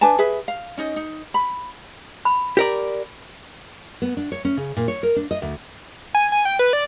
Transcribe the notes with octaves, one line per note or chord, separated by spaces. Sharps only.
D4 B4 G#5 A5
G#4 B4 E5
F5
C#4 D#4 D#5
D#4
B5
B5
G4 A#4 D5
B3
D4
C#5
C#4
C#3
A#2
C#5
A#4
D4
D#5
D2
G#5
G#5
G5
B4
D5